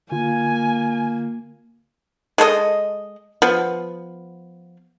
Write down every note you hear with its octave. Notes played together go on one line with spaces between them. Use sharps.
D3 A#3 F4 G#5
G#3 A4 C5 D#5
F3 B3